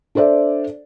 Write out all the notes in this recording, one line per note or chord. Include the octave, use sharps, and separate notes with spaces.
D4 A4 C5 D5 E5